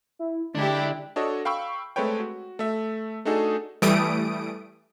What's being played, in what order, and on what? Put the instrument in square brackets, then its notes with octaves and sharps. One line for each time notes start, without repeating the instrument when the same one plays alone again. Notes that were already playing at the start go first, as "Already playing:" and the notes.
[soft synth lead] E4
[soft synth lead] D3 [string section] G#3 E4 G4 [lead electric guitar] D4
[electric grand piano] D4 F#4 A4 C#5 D#5
F5 G5 B5 C#6 E6
G#3 A3 C4 B4 C#5 G5
F#4
A3 E5
A3 D4 D#4 F#4 G#4 A4
[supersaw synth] E3 G3 A3 D#6 D7